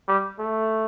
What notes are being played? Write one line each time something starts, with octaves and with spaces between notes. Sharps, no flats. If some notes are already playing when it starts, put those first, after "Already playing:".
G3
A3